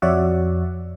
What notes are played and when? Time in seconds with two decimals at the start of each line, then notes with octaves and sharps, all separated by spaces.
0.02 F2 F#4 C#5 D5 E5 F#5